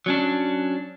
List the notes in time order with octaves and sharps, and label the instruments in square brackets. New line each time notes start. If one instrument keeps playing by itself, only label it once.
[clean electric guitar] F#3 C#4 D4